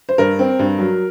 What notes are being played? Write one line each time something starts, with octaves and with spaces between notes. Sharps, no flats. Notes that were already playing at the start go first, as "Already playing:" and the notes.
C5
G2 A#4
C4
G2
F#3